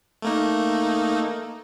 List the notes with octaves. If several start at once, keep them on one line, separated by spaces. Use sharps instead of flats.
A3 A#3 D#4